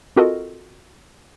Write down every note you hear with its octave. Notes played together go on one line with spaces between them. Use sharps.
C4 F4 F#4 A4 A#4 D#5